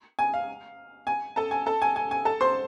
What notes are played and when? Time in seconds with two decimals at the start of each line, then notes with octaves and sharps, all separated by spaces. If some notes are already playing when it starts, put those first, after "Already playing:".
0.19 G#5
0.34 F5
1.07 G#5
1.36 A4 A5
1.51 G#5
1.66 A4 A5
1.82 G#5
1.96 G#5
2.11 G#5
2.25 A4 A5
2.41 C5 C6